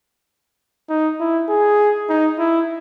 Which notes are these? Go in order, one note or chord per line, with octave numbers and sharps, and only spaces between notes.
D#4
E4
G#4
D#4
E4